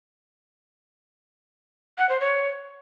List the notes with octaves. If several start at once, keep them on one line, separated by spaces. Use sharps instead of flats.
F#5
C5
C#5